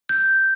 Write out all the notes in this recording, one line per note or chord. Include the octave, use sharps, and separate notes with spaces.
G6